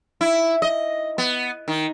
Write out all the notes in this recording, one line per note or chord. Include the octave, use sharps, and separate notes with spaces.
E4
D#5
B3
D#3